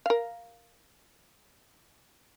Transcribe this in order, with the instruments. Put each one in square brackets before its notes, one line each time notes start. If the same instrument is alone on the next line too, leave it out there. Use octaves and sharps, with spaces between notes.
[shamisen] A#4 F5